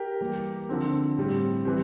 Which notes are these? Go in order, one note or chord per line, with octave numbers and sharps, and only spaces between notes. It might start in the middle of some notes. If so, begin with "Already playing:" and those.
Already playing: G4 A#4
E3 G3 A#3
D3 F3 C4
A2 G3 C4
E3 G3 C4